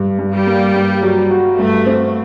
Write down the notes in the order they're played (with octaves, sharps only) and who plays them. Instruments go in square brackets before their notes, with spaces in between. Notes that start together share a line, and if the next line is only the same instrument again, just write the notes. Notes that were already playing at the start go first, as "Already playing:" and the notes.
Already playing: [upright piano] G2
G2
[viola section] G3
[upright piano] A#3
G2
F#3
F#4
[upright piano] G2 [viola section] A3
[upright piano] C4